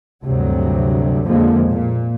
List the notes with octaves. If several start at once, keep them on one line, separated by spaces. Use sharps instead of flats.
D2 G2 C3 F#3
F2 D3 F3 G#3 A#3
A#2